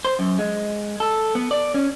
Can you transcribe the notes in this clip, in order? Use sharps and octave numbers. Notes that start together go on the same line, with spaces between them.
C5
F#2
G#3
A4
B3
D5
C#4